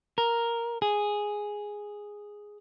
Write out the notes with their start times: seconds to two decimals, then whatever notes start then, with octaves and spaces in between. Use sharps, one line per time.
0.18 A#4
0.82 G#4